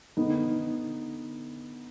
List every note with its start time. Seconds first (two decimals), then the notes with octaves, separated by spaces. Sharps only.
0.17 D3 B3 D#4
0.45 D3